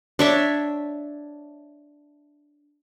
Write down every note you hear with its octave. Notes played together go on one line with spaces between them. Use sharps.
D4 C#5 E5